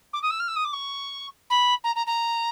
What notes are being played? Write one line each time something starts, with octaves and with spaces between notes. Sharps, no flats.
D6
D#6
E6
F6
E6
D#6
D6
C#6
B5
A#5
A#5
A#5